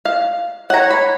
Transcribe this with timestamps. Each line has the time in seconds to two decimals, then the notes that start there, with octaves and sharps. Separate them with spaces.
0.05 F5
0.70 C#5 F#5 A#5
0.90 B5